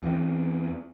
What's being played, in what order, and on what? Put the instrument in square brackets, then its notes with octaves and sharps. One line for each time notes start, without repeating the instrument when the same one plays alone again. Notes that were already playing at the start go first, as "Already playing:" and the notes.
[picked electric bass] E2 E3 F#3 C4